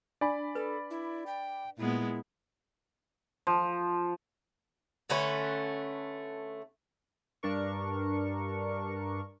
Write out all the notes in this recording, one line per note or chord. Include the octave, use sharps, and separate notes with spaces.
D4 D5 G#5 B5
A4 B4
E4
G5
A#2 G#3 B3 E4
F3
D3 A3 C#4 B4
G2 D4 A#4 C#6